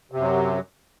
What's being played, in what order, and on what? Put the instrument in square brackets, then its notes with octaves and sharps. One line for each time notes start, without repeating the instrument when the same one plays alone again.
[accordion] C3
F#2
F#3